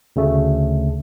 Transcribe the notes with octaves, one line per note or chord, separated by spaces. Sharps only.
D2 C#3 A3